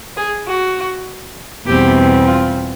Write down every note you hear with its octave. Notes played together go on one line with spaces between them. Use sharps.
G#4
F#4
E2 B2 G3 C4 G4
F4